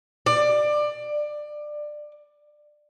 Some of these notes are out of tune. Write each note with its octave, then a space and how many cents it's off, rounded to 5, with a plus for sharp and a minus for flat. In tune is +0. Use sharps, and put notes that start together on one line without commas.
D5 +20